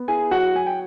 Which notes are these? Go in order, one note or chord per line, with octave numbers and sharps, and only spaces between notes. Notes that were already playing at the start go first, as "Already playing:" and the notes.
Already playing: B3
E4 G#4 G#5
F#3 F#4 F#5
F#3 G#5
G5